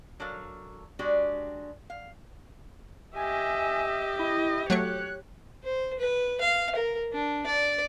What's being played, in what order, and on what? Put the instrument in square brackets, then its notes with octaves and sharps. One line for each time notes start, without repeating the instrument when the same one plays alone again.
[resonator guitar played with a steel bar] F#3 D4 A4 A#4 F5
G#3 D4 F#4 G4
F5
[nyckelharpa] G4 [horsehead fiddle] D#5 E5 [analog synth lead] G#5
[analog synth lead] E4 [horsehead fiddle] D#5
[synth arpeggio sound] F#3 A3 C#6 [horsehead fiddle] C#5 [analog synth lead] F#6
[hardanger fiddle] C5
B4
F5
A#4
D4
D5